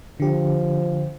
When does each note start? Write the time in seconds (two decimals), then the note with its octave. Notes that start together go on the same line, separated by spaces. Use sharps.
0.20 D3 F3 G4